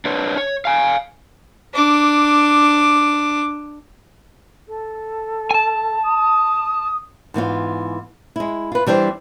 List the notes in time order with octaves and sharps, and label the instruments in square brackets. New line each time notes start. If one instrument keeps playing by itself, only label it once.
[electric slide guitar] D4 B4 C#5
C#5
F5 G#5
[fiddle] D4 D6
[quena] A4
[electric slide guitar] G#5 A5
[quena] D#6
[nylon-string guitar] G#2 E3 B3 F4
G#3 E4
F4 B4
E3 G3 C4 D4 C5